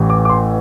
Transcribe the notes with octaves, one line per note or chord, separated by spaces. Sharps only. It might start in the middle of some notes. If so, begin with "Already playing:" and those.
Already playing: A1 A2 E3
D6
D6
C6